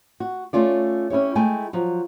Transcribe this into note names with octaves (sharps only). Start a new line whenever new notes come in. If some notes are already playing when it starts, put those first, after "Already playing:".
F#4
A3 C#4 F4 D5
C#4 E4 G4 C#5
G#3 A3 E4 G5 G#5
F3 F#3